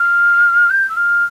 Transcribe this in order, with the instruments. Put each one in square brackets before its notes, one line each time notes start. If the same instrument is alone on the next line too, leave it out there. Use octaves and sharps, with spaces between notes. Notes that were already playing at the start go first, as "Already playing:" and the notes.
Already playing: [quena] F6
G6
E6
F6